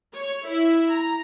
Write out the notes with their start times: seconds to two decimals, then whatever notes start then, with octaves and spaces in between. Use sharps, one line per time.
0.15 C#5
0.49 E4
0.90 A#5